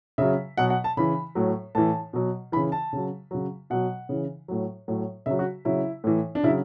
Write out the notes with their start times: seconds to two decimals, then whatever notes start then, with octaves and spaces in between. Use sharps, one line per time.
0.18 C#3 F#3 E5
0.57 B2 F#3 F#5
0.70 F#5
0.84 A5
0.97 C#3 E3 B5
1.35 A2 F#3
1.75 A2 E3 A5
2.13 B2 F#3
2.52 E3 B5
2.56 C#3
2.72 A5
2.93 C#3 F#3
3.31 C#3 F#3
3.70 B2 F#3 F#5
4.09 C#3 E3
4.48 A2 F#3
4.88 A2 F#3
5.26 C#3 F#3 E5
5.39 F#4
5.65 C#3 F#3 E4
6.04 A2 E3
6.35 D4
6.43 C#3 E4
6.47 F#3